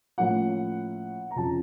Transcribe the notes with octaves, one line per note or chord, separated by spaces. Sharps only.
A2 F3 A#3 C#4 F#5
A#5
F2 C#3 F3 A5